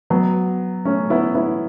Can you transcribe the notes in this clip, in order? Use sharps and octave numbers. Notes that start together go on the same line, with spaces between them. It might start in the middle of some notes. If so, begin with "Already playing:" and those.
F#3 B3
A3 C#4
B3 E4
B3 E4